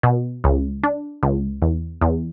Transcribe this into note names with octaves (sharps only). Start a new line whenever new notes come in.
B2
C#2
D4
C#2
E2
E2